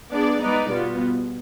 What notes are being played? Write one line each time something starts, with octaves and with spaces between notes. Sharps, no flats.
B3 D4 G#4 D5
G#3 B3 D#4 B4 D5
B2 G3 B3 F4